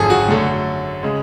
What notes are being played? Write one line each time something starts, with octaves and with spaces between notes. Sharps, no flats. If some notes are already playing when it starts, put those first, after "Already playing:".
Already playing: G#1 F#2 D3 F3 A3 G#4 A4
F#4
F#2 D3 F#3 A3
C#3 G#3